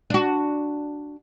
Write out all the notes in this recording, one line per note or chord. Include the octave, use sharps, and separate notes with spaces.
D4 F#4